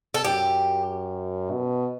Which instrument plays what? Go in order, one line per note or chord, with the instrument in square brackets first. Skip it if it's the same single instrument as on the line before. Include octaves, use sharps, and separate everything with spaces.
[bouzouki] A4
[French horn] F#2 [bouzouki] G4
[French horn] B2